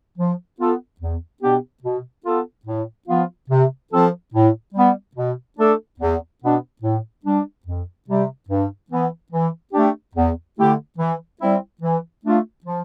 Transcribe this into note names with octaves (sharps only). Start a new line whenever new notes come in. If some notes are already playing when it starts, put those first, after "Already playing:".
F3
B3 F4 A4
E2
B2 B3 D4 G4
B2
B3 F4 A4
A2
F3 B3 F4
C3
F3 C4 F4 A4
A2
G3 B3
B2
A3 D4 A4
E2
B2 B3 D4
A2
G3 D4
F2
C3 G3
G2
E3 B3
E3
A3 D4 G4
E2
D3 A3 E4 G4
E3
G3 C4 E4
E3
A3 D4 F4
F3